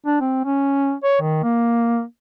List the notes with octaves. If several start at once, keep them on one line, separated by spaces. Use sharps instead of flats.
D4
C4
C#4
C#5
D#3
A#3